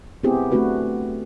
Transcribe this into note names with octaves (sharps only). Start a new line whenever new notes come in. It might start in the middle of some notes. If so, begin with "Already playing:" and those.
B3 C4 E4 G4 G#4 C5
A3 C4 D4 F#4 B4